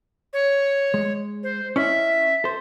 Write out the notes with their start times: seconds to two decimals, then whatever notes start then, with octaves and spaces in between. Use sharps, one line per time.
0.33 C#5
0.94 G#3
1.43 C5
1.76 C#4 E4 D#5 E5
2.44 A4 C5